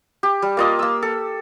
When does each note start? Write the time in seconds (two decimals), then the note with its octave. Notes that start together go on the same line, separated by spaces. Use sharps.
0.23 G4
0.42 G3
0.57 A#3 F4 D#5
0.79 A#3 E6
1.02 A4